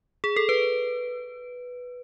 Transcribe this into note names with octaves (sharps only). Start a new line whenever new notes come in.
G#4
A4
B4